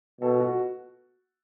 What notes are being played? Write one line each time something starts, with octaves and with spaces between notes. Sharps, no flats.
B2 A4
F#4